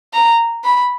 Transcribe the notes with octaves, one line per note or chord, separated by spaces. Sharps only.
A#5
B5